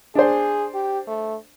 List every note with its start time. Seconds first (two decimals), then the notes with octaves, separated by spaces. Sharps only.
0.15 D4 G#4 C5
0.74 G4
1.08 A3